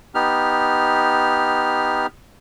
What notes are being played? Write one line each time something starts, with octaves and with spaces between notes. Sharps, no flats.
B3 D#4 G4 F6